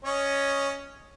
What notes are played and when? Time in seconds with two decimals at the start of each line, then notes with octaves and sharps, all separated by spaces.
0.05 C#4 C#5 D#5